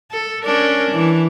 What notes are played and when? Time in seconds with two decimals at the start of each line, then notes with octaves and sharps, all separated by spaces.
0.11 A4
0.45 C#4 D4 A#4
0.91 E3